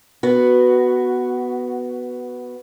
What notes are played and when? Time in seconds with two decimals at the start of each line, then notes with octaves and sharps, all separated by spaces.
0.23 B3 F#4